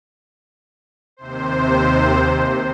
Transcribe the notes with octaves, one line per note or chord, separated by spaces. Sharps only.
D#2 C3 C5